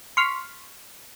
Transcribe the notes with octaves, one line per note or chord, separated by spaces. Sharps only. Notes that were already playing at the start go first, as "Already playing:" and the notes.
C6 C#6 F6 B6